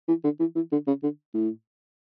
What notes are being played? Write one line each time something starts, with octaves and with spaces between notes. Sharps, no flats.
E3
D3
E3
E3
D3
C#3
D3
A2